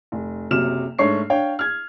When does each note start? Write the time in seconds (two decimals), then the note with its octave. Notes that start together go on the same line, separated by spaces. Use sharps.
0.12 F1
0.51 F#1 C3 F#3 F6 E7
0.99 G#2 A3 D4 C#5 C#6 C7
1.30 D4 C#5 F5 G5
1.59 F6 G#6